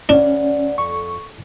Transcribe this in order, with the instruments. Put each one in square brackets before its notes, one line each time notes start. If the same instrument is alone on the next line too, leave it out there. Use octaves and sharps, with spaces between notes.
[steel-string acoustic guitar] D2 D5 F#5 [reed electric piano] C#4 [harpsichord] D4
[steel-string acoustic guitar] F2 [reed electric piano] C#6